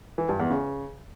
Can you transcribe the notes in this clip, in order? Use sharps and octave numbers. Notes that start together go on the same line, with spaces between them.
E3
G2
E2
C#3